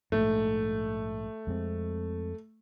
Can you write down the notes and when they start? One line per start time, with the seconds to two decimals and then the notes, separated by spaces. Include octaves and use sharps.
0.12 A#1 G#2 A3
1.47 F2 G#3 C4